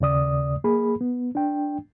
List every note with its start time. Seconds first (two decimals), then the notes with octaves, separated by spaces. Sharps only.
0.01 D#2 C#3 D5 D#6
0.64 A#3 G#4 B5
1.01 B3
1.35 D4 G5